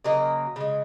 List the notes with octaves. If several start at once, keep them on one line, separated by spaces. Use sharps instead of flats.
C#3 F#3 A#3 D#5
C#3 G#3